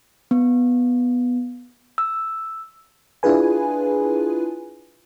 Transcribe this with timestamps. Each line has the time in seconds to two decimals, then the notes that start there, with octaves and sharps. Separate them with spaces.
0.31 B3
1.98 E6
3.23 D4 E4 F4 G#4 B4 G#5